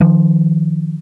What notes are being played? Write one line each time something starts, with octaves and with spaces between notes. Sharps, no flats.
D#3 F3